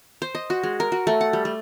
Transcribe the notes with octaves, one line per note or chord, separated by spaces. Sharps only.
C5
D#5
F#4
G#3
A#4
F#4
A3
F#5
G3
A3